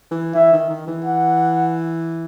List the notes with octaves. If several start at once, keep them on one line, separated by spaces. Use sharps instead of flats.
E3
E3 E5
D#3
D#3
E3
F#5